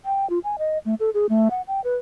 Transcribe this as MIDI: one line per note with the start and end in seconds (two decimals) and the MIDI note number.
0.05 0.28 79
0.30 0.39 65
0.44 0.56 80
0.59 0.78 75
0.85 0.95 57
1.00 1.10 69
1.14 1.26 68
1.29 1.48 57
1.51 1.62 78
1.68 1.81 79
1.84 1.95 71